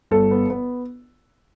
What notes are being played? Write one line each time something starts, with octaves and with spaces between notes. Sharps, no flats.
G1 A4
B3
B3